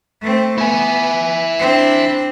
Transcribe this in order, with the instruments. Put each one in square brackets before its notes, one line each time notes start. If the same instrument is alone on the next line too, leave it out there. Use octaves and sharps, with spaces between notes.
[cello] A3 C4
[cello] B3 [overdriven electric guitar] E4 G#5
[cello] C4 D4